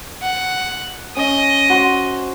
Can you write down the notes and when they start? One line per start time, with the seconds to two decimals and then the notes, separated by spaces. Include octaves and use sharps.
0.22 F#5
1.17 C#4 D#5
1.70 F#4 C5